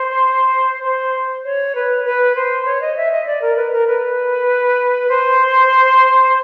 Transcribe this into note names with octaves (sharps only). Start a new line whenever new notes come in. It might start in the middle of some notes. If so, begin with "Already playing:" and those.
Already playing: C5
C5
C#5
B4
B4
C5
C#5
D#5
E5
D#5
D5
A#4
B4
A#4
B4
C5